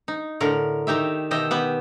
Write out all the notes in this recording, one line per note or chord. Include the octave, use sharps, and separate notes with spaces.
D#4
A2 D3 A#4
D#3 D#4 G4 E5
B2 D#3 G4 D#5 E5
B3 G4 B4